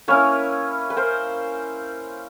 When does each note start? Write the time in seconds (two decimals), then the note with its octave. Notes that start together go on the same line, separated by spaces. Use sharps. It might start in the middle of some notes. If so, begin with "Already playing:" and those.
0.08 A#3 C#4 E4 B4 C#5
0.90 B4
0.97 A#4 C5